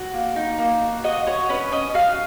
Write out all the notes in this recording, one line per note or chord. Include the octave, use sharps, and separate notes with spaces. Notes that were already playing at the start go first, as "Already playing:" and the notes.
Already playing: F#4
A#3
D#4
A#3
F#4
F#4 D#5
F#4 C#5
C#4 B4
C#4 D#5
F#4 F5